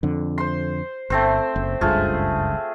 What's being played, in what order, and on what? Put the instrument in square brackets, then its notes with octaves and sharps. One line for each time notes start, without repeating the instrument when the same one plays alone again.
[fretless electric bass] F2 D3
[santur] C5 C6
[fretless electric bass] G1 [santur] A3 C4 C5
[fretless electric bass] F#1
[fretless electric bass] F#1 C#2 G2 [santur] A3 F4 G#4